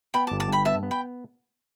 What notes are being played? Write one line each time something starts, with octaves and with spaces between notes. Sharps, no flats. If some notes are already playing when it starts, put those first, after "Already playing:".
B3 G5 B5
A5 D6
G1
A5 D6
G2 G5 B5
B3 E5 A5
B3
G5 B5